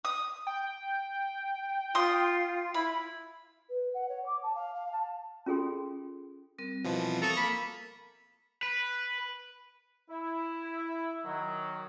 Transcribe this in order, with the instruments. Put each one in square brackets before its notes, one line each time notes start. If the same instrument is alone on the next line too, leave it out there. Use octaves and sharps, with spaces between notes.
[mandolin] D#6
[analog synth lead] G5
[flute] F4 [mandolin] C6 D#6
[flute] E4 [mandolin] B5
[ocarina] B4
F#5
C#5
D6
A5
F5
F5
A5
[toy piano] C#4 F4 G#4 A4 G5 C6
[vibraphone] G3 C4 A#4
[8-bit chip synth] B2 E3 F3
[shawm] A4 [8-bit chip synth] A#5 C#6 D#6
[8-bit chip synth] A#3 [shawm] B5
[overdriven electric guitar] B4
[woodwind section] E4
D#3 F#3